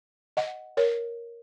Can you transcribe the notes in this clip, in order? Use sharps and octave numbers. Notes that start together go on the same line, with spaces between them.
D#5 F#5
A#4 C#5